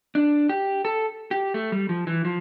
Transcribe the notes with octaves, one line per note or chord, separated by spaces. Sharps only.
D4
G4
A4
G4
A3
G3
F3
E3
F3